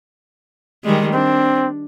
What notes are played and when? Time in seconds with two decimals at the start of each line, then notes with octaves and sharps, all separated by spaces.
0.84 D#3 G3 G#3
1.13 C4 D4